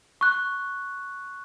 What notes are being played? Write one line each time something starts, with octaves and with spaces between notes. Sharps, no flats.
C#6 F#6